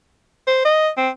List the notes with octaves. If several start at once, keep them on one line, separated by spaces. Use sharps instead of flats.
C5
D#5
C4